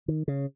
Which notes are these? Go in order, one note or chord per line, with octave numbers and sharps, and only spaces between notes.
D#3
C#3